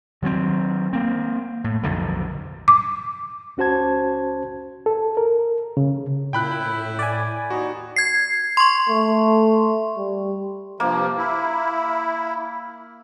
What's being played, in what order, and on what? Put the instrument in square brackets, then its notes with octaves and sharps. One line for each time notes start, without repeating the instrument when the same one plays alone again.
[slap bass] D#3 F#3 G#3 C4
A#3 C4
A2
B1 F2 D3 D#3
[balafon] D6
[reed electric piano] C#2 C#4 F#4 C5 A5 G#6
A4
A#4
C#3
[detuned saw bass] A#2 [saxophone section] E4 [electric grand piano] G5 B5 F#6
[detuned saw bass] A2
[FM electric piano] D5 G#5
[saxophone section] D#2 D#4 [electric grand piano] F#4
[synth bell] G#6 C7
C6 C#6
[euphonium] A3
G3
[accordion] G2 C3 F3 [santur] A#3
[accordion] E4